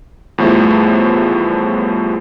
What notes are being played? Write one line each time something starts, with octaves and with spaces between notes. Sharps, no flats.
E2 A2 F3 G3 A3